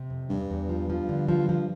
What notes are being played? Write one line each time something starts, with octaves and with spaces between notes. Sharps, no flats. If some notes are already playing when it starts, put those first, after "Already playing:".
Already playing: C3
F2
E2 G2
E2
F3
F3
D3
F3
F3